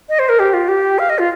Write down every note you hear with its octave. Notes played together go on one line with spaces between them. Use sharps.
D#5
C5
A#4
G4
F4
G4
F5
D#5
F4